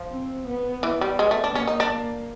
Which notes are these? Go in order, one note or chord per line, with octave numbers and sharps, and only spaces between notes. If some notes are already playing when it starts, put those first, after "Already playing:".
Already playing: F3
C4
B3
E3 B3
G3
G#3
A3
D4
A#3 C#4
D#4
D4
A#3